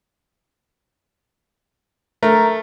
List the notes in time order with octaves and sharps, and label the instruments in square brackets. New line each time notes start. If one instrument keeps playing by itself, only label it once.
[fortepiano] A3 [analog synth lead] A#4